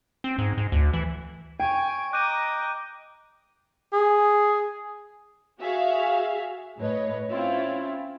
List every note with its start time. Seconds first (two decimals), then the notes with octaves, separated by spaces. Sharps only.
0.24 C4
0.38 G#2
0.58 G#2
0.72 D2
0.93 E3
1.60 C#5 G5 G#5 D7
2.13 D#5 A#5 D6 F#6 G6 D#7
3.93 G#4
5.60 F#4 G#4 E5 F5
6.78 A2 B4 C#5 D#5
7.29 C4 C#4 E4 F4